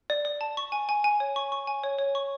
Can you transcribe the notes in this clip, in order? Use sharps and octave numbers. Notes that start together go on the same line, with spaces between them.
D5
D5
A5
C#6
G#5
G#5
G#5
C#5
C#6
C#6
G#5
C#5
C#5
C#6